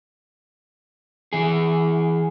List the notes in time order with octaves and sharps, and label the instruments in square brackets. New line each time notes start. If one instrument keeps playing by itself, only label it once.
[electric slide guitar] E3 G#4